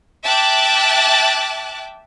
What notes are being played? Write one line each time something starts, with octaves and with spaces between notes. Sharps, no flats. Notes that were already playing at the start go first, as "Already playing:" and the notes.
E5 G5 A5 D6 F#6